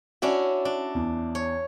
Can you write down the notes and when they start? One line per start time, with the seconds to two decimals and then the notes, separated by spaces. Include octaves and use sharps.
0.22 C#4 D4 E4 F#4 D5
0.65 D4
0.95 E2
1.35 C#5